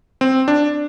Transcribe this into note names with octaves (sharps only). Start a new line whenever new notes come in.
C4
D4